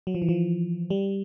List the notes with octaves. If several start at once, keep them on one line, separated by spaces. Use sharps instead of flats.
F#3
F3
E3
F3
G3